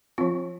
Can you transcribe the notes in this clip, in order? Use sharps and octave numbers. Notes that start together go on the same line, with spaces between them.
F3 C4 F4